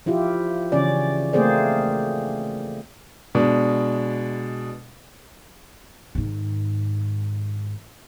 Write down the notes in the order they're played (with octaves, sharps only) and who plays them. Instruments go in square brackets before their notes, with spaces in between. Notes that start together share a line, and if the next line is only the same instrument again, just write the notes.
[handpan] F3 E4 F4 G4
C#3 E3 C#4 D5
A3 A#3 C4 G#4 C5 D5
[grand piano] B2 G#3 D4
[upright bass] G#2 D#3